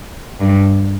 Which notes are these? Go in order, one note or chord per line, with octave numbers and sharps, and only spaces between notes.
G2